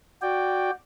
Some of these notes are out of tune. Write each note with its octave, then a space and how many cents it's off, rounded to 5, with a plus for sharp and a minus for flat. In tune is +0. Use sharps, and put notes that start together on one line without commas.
F#4 -5 D5 +0 G5 +0